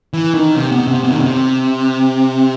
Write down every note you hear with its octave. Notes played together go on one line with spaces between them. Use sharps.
E3
D#3
C3
B2
C3
B2
D#3
C3